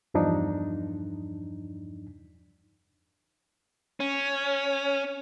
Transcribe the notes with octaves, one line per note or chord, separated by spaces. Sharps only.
E2 G2 F3 D4 D#4
C#4